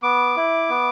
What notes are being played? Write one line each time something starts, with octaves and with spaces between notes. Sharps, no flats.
B3 D6
E4
B3